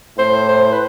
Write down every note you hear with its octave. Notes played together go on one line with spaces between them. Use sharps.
A2 C5
C5
B4